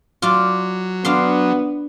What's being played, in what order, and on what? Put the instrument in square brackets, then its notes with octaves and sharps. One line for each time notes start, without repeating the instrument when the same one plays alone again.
[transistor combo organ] F#3 [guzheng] F4 D5
[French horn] B3 [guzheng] D4 F5 C6